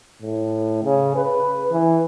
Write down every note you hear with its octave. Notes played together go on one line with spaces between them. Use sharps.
A2
C#3
B4
E3